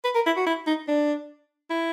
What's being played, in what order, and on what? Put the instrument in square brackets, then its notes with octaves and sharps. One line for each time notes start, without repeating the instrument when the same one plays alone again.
[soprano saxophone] B4
A#4
E4
F#4
E4
D#4
D4
E4